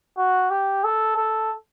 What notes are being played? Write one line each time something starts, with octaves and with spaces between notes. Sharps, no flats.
F#4
G4
A4
A4